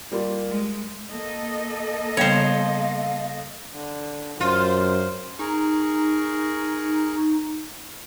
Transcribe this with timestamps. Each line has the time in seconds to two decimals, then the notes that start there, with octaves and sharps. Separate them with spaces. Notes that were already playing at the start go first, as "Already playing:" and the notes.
0.12 G3 A#3 F4
0.50 G#3
1.12 A#3 A4 D#5
2.17 C#3 G3 B3 C5 C#5 F5
3.75 D3
4.40 F#2 F4 C5
5.39 D#4 G#4 A#4 C#6